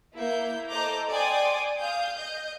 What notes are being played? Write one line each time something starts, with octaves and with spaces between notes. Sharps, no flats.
A#3 E4 G6
A4 C5 D#5 A#5 D6 G6
D5 G5 G#5 C6 D6 D#6
F5 D#6 G6
D#5 G6